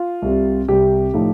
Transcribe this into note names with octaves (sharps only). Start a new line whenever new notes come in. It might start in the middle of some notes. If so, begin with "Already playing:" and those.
Already playing: F4
C2 C3 G3
C2 C3 G3 G4
A2 F3 A3 D#4